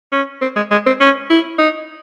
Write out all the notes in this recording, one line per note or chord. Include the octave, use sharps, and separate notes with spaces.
C#4
C4
G#3
G#3
C4
C#4
E4
D#4